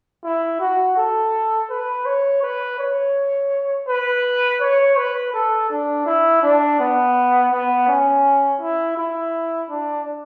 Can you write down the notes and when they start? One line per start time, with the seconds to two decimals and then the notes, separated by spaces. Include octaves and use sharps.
0.24 E4
0.60 F#4
0.97 A4
1.70 B4
2.06 C#5
2.43 B4
2.79 C#5
3.88 B4
4.61 C#5
4.97 B4
5.34 A4
5.70 D4
6.06 E4
6.43 D4
6.79 B3
7.52 B3
7.88 C#4
8.61 E4
8.97 E4
9.70 D4